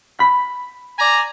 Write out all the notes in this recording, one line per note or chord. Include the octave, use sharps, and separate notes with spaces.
B5
D5 G#5 A#5